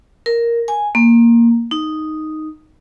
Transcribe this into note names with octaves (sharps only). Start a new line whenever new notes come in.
A#4
G#5
A#3
D#4